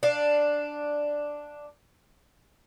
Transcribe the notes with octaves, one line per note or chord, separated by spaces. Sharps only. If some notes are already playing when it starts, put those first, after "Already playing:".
D4 F5